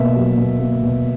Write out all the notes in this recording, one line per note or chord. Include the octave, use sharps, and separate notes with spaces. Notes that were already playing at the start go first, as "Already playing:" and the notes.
Already playing: B2 A#3 E5
F#3
B2
A#3
B2